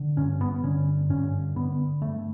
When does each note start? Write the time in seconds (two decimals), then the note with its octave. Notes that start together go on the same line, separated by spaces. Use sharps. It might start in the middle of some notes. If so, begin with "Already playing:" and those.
Already playing: D3
0.17 G2 C#4
0.41 B3
0.63 D3 C#4
1.10 G2 C#4
1.56 D3 B3
2.02 G2 A3